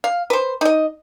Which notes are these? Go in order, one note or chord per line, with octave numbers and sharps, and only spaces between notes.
F5
B4 C5
D#4 D#5